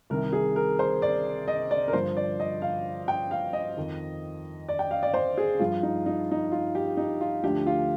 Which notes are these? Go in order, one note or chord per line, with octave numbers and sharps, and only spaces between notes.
C2 C3 D#3 A#4
G#4
A#4
C5
D5
D#5
D5
A#4
G2 D3 F3 C5
D5
D#5
F5
G5
F5
D#5
F2 D#3
D5
G5
F5
D5
C5
G#4
G2 F3 F4
D#4
D#4
D#4
F4
G4
D#4
F4
D2 D3 F3 G4
F4